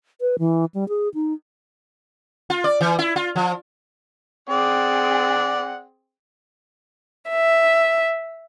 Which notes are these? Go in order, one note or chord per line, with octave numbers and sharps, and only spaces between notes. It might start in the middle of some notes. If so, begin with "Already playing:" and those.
B4
E3
G3
G#4
D#4
F4
D5
E3
E4
F4
F3
C4 G#4 D5 F#5
E5